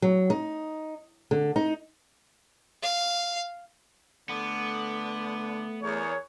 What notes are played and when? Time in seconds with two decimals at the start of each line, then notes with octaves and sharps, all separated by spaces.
0.02 F#3
0.30 D#4
1.31 D3
1.56 D#4
2.82 F5
4.29 D3 A3 B3
5.83 E2 G#4 A#4 C#5